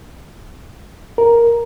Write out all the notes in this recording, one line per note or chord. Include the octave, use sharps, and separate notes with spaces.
A#4